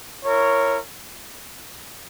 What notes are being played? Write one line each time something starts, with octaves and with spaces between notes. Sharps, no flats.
E4 A#4 C#5